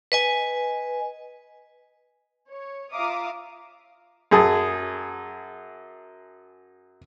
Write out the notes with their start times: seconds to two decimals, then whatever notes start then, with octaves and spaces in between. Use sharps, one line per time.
0.12 B4 D#5 G#5
2.49 C#5
2.92 F4 E5 F5 A#5 D6 D#6
4.31 F#2 G#4 A5